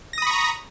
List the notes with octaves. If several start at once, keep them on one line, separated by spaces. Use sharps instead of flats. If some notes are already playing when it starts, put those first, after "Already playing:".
A#5 B5 C#6 D#6 A#6